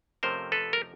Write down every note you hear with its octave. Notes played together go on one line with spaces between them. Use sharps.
F2 C3 F3 A3 C#4 A#4 C5
A4 B4
A#4